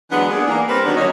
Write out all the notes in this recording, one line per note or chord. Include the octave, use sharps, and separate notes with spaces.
E3 F#3 G#3 B3 D4
A#3 B3 D4 G#4
E3 A#3 D4
G3 A#3 C4 A#4 B4
D3 D#3 F#3 B3 D4
D#2 D3 F#3 C#4 C#5 D#5